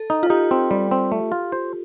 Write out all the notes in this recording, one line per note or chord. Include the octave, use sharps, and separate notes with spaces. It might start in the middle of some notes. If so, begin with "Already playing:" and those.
Already playing: A4
D#4
F4
D#4 G4
C4
G3
C4
A3
F4
C5